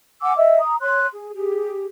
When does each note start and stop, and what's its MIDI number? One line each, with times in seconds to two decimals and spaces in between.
0.22 0.35 78
0.22 0.35 80
0.22 0.35 86
0.22 0.35 88
0.36 0.59 75
0.36 0.59 76
0.36 0.59 88
0.59 0.75 82
0.59 0.75 87
0.81 1.07 73
0.81 1.07 84
0.81 1.07 90
1.13 1.34 68
1.34 1.85 67
1.34 1.85 68